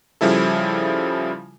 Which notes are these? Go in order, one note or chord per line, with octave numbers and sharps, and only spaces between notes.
C#3 F3 G3 E4 A4